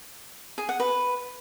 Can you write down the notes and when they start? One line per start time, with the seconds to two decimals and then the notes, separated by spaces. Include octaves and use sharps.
0.58 G#4
0.69 F#5
0.80 B4